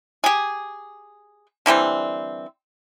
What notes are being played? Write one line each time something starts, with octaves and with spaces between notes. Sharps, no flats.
G4 G#4
D3 E3 G3 C4